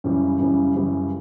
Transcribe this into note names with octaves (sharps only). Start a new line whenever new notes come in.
F#2 C#3 E3 G3
F#2 C#3 E3 G3
F#2 C#3 E3 G3